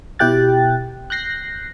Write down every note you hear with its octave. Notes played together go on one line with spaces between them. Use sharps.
B2 E4 G4 G5 F#6 A6
F#6 G6 A#6 C7